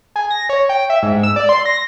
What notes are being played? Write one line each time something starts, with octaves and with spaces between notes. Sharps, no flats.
G#4
A#6
C#5
G5
E5
G#2
E6
D5
C6
A#6